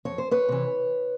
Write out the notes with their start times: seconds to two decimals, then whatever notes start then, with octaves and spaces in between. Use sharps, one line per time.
0.05 F2 C#5
0.18 C5
0.31 B4 C#5
0.49 C3 E3